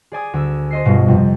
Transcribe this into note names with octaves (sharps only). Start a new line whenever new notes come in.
G#4 D5 G#5 D#6
D2 E6
C5 D#5 C7
G1 G2 B2
F2 C3